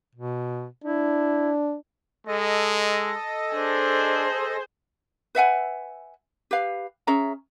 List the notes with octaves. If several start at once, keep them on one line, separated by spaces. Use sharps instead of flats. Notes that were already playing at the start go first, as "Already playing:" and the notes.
B2
D4 E4
G#3 A4 D#5
D4 G#4 C5
B4 E5 F#5 G#5
G4 B4 F5
C#4 G#4 E5 A#5